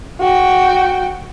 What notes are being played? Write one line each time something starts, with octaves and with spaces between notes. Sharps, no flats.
F#4 G5